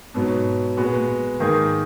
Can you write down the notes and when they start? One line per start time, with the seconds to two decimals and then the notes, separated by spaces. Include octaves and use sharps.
0.14 G#2 B2 F#3 B3
0.77 A#2 G#3 B3 F#4
1.40 G#2 D#3 A#3 D#4 G#4